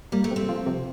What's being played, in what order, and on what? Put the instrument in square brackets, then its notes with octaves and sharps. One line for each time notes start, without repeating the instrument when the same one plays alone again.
[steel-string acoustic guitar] G3 [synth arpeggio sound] A#3
[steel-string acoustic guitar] A3
[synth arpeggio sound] C3
[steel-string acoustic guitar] C4
[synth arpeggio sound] F3
C3